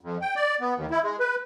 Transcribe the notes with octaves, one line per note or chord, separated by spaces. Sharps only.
F2
G5
D5
B3
D#2
E4
G#3
B4